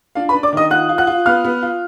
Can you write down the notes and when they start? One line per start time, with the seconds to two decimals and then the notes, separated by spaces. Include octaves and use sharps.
0.15 D4 F4 F5
0.29 B4 B5
0.34 D4
0.43 D5 D6
0.53 D#3 D#5 D#6
0.70 F4 F#5 F#6
0.89 F4
0.98 F#5 F#6
1.07 F4
1.26 B3 F5 F6
1.44 B3
1.63 F4